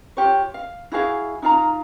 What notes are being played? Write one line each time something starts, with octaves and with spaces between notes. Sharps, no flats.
F4 G4 C#5
F5
E4 F#4 G#4 F5
D#4 F4 F5 A#5